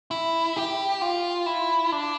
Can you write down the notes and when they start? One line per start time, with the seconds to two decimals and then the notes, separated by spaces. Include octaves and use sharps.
0.11 E4
0.56 G4
1.02 F4
1.46 E4
1.92 D4